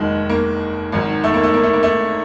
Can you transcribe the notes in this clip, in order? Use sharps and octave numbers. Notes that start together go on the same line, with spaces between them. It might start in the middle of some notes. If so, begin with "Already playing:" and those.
Already playing: F1 D#2 D#3 F#3 G#3
A#3
G#1 G#2 D#3 F#3
A3
A#3
A3
A#3
A3
A#3
A3